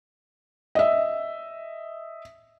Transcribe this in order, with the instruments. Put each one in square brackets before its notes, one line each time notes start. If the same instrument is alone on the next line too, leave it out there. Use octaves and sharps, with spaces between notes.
[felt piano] D#5 E5